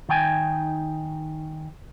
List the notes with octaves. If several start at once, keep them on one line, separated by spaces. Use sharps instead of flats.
D#3 D#4 G5 G#5